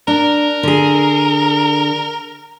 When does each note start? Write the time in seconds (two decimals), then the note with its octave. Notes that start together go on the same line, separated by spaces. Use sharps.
0.08 D4 A#4
0.63 D3 G#4